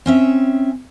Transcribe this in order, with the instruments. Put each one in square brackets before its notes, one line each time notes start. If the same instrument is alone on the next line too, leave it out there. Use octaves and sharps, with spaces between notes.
[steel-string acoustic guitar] C4 C#4 E5